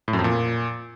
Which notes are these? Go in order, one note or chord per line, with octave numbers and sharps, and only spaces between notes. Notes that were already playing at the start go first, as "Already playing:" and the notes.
A2
F#2
F2
A#2